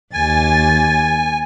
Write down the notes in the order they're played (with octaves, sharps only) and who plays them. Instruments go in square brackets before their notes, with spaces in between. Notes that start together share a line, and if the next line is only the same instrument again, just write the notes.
[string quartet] D#2 A6 [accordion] G#5